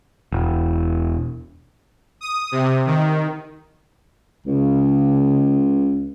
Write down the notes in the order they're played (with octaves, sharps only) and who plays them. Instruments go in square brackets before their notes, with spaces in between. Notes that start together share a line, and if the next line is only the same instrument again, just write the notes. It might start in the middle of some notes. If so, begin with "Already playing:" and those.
[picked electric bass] E1
[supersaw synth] D#6
C3
D#3
[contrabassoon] C#2 [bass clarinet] C#3